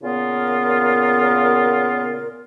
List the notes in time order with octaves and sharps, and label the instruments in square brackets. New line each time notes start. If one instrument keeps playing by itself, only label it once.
[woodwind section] A#2 C#3 B3 F4 A#4